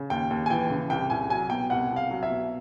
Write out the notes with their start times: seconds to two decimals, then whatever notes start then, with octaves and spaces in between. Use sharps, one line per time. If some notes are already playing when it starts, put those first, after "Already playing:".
Already playing: C#3
0.10 D#2 G5
0.31 D#2
0.46 G#5
0.50 E3 G5
0.70 C#3
0.90 C2 G5
1.10 C2 G#5
1.30 F#3 G#5
1.50 B2 G5
1.70 C2 F#5
1.90 C2
1.96 F5
2.11 F#3
2.23 E5
2.30 B2